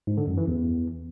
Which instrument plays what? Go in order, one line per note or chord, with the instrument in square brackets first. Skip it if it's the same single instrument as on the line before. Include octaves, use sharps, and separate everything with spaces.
[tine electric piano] G#2
D3
F#2
E3
E2